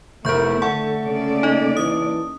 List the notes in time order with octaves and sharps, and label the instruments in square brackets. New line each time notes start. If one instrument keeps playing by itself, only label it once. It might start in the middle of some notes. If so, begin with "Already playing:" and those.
[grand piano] F1 A#4 [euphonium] A3 [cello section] B3 E4 [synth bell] C#6 G6
[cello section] D3 [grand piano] A4 A5 C#6 [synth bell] F#5
[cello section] C#3 A#3 D5
[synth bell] D#4 D#5
[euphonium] E3 [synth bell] D#6